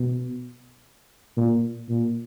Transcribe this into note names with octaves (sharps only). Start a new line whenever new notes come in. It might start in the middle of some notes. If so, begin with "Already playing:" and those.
Already playing: B2
A#2
A#2